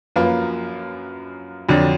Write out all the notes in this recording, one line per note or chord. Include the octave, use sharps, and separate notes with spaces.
F#2 F3 A#3 F4 B4
F2 D3 F#3 D4